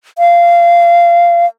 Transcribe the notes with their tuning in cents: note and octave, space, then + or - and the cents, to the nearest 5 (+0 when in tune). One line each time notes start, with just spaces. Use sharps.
F5 -20